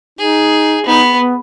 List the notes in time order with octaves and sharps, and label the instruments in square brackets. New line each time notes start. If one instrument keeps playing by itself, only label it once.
[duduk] D#4 [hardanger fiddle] G#4
[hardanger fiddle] B3 [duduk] D#4
[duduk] B3